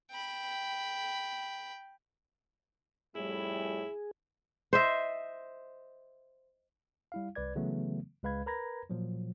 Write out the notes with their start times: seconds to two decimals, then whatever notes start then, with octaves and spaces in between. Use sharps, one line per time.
0.11 G5 B5
3.15 F2 A2 G3 E4 G#4
4.73 C5 D#5 E5
7.12 G3 E4 F5
7.35 C2 B4 D5 G#6
7.55 C#3 E3 F#3 A3 B3
8.23 C#2 G#3 B4 F5 B5 G#6
8.46 A#4 B4 A#5 B5 G#6 A#6
8.90 A#2 F3 F#3